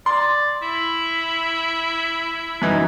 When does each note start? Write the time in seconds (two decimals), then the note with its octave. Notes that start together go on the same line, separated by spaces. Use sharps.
0.06 D5 C6
0.62 E4
2.62 F#2 E3 D#4